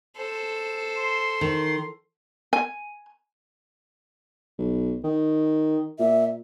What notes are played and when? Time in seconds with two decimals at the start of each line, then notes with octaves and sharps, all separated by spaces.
0.17 A4 C5
0.97 C6
1.41 D#3
2.53 G#5
4.59 B1
5.04 D#3
6.00 A#2 E5